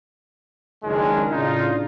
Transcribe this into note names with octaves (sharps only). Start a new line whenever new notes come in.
F#1 C#2 D#3 G#3 C#4 D4
A2 C#3 D4 D#4 F4